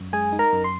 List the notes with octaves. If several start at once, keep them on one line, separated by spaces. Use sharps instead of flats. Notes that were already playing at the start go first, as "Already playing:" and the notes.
Already playing: F#2
G#3 G#4 G#5
D#4
A#4 A#5
F#2
C6